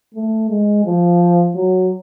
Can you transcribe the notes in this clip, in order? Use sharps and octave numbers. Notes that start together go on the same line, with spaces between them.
A3
G#3
F3
F#3